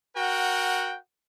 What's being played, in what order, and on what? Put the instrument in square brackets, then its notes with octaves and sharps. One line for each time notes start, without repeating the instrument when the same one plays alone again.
[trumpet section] F#4 A#4 F#5 G5